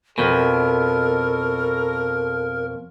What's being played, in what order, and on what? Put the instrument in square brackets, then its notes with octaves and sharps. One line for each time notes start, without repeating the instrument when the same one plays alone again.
[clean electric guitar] F2 B2 [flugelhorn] A4 [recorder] A#4